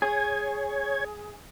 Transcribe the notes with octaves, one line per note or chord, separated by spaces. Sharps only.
G#4 C#5 G#6